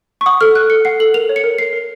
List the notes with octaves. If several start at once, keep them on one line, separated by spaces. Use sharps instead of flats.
C#6
F#5 D#6
A4 F6
A4 F#6
A4 C#7
F#5 C7
A4 F#7
A#4 F7
C#5
C#7
A#4
A#4 C7
A#4